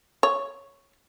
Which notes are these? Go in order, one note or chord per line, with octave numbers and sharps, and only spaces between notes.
C#5